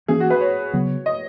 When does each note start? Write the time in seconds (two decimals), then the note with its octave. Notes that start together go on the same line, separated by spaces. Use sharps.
0.08 E3 A#3 C#4 G#4
0.20 F#4
0.30 B4
0.41 C#5
0.74 C#3 F#3 B3
1.06 D#5